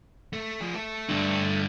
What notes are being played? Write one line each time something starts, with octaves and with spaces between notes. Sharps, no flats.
A3
F3 G#4
A3 A4
G2 D3